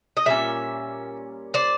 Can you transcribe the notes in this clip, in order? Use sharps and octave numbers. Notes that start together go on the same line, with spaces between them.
D#5
A#2 G3 C#4 E5
C5 D5